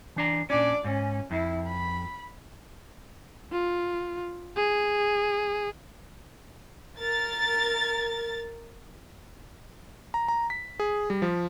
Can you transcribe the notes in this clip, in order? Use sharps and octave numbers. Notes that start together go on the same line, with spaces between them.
E3 D4 A#5
A#2 C#4 D4 D5
G#2 C#4
F2 E4
B5
F4
G#4
A#4 A6
A#5
A#5
B6
G#4
G3
F3